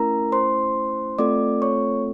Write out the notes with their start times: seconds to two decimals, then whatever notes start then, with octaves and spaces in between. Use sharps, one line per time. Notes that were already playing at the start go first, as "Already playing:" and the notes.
Already playing: A3 C#4 E4 A#4 A#5
0.32 C5 C6
1.18 A3 C4 F4 A4 D5 D6
1.62 C#5 C#6